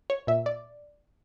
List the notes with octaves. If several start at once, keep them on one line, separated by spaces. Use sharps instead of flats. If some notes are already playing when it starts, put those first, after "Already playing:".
C#5
A#2 E5
D5